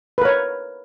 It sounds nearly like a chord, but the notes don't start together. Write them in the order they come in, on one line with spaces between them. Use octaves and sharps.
B4 A#4 C#5